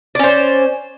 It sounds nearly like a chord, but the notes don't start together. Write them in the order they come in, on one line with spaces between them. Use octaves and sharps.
D5 C#4 C5